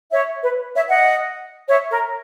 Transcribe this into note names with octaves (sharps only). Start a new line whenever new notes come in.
C#5 E5
B4
C#5 E5
D#5 F#5
C#5 E5
A#4